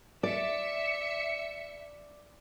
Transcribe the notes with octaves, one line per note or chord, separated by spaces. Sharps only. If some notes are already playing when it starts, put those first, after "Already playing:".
D5 E5 C#7